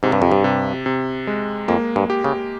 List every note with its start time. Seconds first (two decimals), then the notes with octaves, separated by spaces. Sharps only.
0.03 G#2 C3
0.12 G2
0.22 F2
0.32 G2
0.44 C3
0.86 C3
1.27 G#3
1.68 F2 A#3
1.96 G2
2.10 G4
2.24 C#3